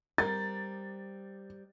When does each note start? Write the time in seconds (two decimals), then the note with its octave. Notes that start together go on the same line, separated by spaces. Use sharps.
0.18 G3 C4 A#4 A6